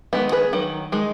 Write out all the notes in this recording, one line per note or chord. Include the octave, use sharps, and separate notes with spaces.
D#3 G#3 B3
G#4 B4
D#3 F#3
D#3 G#3 D#4